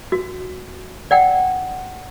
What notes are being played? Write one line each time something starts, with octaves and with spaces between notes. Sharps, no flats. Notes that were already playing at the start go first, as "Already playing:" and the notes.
F#4
D5 F#5 G5